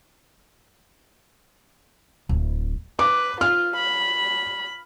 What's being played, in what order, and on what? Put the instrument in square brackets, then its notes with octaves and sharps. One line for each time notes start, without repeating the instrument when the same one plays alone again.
[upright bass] D1
[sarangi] B4 [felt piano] D6
[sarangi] F4 [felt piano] F6
[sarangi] B5